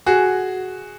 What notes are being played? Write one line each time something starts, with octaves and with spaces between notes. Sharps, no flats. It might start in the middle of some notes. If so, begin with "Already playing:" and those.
F#4 G#4